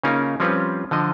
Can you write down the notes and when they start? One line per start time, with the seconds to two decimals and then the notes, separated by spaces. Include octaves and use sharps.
0.04 C#3 A#3 C#4 D#4 F4 A#4
0.40 F3 G3 C4 C#4 F4 B4
0.91 D3 F3 D#5